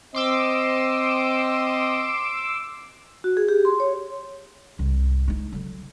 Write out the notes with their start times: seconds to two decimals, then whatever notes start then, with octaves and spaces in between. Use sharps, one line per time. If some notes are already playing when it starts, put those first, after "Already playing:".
0.15 C4 D#5 C6 D6 E6
3.24 F#4
3.37 G#4
3.49 G4
3.65 C6
3.80 C#5
4.79 C2 G#2
5.28 G#3 D#4
5.52 D3 F#3